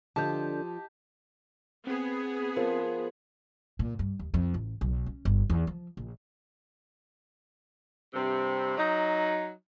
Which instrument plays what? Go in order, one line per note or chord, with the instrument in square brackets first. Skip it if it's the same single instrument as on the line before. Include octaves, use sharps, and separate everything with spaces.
[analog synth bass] D3 [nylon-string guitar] F3 F4 [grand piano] G4 D#5 [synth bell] A5 G6
[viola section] B3 G#4 [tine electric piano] C4
[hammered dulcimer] F3 [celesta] A#4
[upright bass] A#2
G2
D#2
F2
A1
B1
C#4
G1
E2
F3
A#1
[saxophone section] G2 C3
F#3 D#4